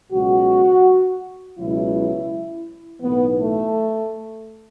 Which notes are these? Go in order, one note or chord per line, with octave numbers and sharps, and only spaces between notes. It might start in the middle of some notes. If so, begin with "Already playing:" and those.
C#2 B2 F#3 F#4
C#2 B2 F#3 E4
B1 A2 E3 B3
A3